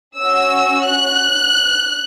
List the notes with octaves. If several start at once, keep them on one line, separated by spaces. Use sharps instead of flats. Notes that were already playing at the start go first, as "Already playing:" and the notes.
C#4 F#4 E6
F#6